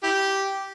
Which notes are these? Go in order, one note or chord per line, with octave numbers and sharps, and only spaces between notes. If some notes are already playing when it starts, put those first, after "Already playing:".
E4 G4